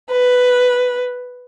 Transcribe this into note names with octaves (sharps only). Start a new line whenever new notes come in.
B4